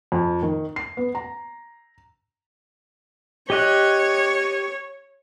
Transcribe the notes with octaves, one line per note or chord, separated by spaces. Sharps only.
F2
D#3
C7
B3
A#5
G4 C#5 D#5 F#6